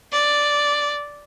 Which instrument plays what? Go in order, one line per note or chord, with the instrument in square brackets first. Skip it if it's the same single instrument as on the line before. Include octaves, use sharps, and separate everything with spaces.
[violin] D5